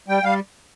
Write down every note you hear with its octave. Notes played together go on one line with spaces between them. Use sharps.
G3 G5
G3 F5